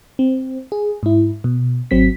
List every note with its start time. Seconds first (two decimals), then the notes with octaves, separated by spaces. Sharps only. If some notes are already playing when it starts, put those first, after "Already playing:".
0.19 C4
0.72 G#4
1.03 G#2 E4
1.44 B2
1.91 G#1 F#3 C4 B6